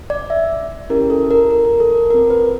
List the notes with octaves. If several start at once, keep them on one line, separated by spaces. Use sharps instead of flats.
D5
E5
C#4 E4 G4 A#4
A4
A#4
A#4
A#4
A4
A#4
C4 F4 A4 A#4
B4